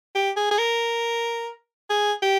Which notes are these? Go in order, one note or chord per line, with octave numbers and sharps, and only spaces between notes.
G4
G#4
G#4
A#4
G#4
G4